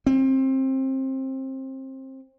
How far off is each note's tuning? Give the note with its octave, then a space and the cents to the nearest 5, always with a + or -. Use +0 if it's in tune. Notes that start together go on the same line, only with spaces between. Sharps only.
C4 +25